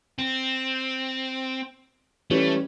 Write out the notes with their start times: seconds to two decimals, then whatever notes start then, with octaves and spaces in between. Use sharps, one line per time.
0.19 C4
2.30 E3 G3 A3 C#4